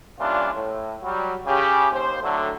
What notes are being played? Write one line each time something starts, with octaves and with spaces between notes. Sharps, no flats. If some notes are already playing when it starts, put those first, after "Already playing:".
A#2 E3 G3 C#4 D4 F4
A2
F#3 G3
C#3 G4
D#2 C5
A2 D3 F#3